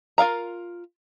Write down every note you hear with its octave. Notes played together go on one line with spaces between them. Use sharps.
F4 A#4 F5 A#5